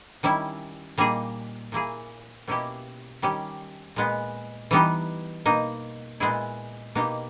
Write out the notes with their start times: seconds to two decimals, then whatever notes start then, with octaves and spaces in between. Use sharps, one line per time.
0.23 D#3 G3 C#4 E4
0.98 A#2 G3 A#3 D#4 G#4
1.72 A#2 A#3 E4 G#4
2.47 B2 A#3 C#4 E4 G4
3.22 D#3 G3 C#4 G4
3.96 A#2 G#3 B3
4.71 E3 G3 B3 D#4 G4
5.46 B2 A#3 D#4
6.20 A#2 G#3 B3 E4 G#4
6.95 B2 A#3 D#4 G4